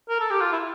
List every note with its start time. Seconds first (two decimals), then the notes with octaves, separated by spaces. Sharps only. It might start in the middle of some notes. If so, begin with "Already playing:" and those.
0.09 A#4
0.20 A4
0.31 G4
0.41 F4
0.52 E4